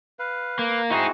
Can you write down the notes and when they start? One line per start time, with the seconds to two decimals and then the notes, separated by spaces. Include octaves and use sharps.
0.19 B4 F5
0.59 A#3
0.90 C4 D#4 E4 F#4 G#4